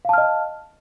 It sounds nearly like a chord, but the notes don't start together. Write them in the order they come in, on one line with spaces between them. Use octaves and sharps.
F5 A5 F6 D#5